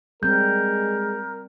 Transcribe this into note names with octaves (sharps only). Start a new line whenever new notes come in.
G3 G#3 C4 A#4 G6